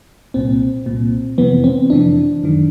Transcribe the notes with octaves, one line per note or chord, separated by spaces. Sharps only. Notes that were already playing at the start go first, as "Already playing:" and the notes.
C2 A#2 C4
C2 A#2
F2 C3 E3 B3
C4
F2 C3 E3 D4
F#2 D#3